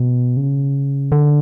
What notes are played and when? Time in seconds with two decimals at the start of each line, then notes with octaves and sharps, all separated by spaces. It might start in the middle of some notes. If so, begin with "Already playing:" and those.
Already playing: B2
0.37 C#3
1.12 D3